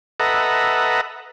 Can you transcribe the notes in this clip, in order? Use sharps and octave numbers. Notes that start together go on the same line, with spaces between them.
A4 B4 D#5 E5 F#5 A#5